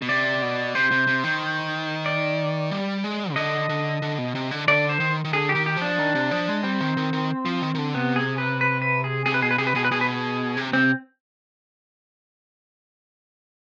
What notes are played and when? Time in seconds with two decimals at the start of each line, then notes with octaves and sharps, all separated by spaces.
0.02 B2
0.09 C3 D5
0.42 B2
0.75 C3 C5
0.91 C3
1.07 C3
1.24 D#3
2.06 D5
2.71 G3
3.04 G#3
3.32 C3
3.36 D3 D#5
3.69 D3
4.02 D3
4.18 B2
4.35 C3
4.51 D3
4.68 D3 D5
4.89 C5
5.00 D#3
5.24 D#3
5.33 D3 G#4
5.49 G4
5.55 D#3
5.66 G4
5.77 F3
5.82 D4
5.99 D#3
6.15 C3
6.31 F3
6.48 G#3
6.63 G3 C4
6.81 D#3
6.97 D#3
7.13 D#3
7.45 F3
7.62 D#3
7.75 D#3
7.78 D3
7.94 C3 B3
8.16 G#4
8.38 B4
8.61 B4
8.82 B4
9.04 G#4
9.26 C3 G#4
9.34 B4
9.42 B2 G#4
9.51 B4
9.58 C3 G#4
9.67 B4
9.75 B2 G#4
9.85 B4
9.91 B2 G#4
10.01 B4
10.09 G#4
10.57 C3
10.73 C3 C4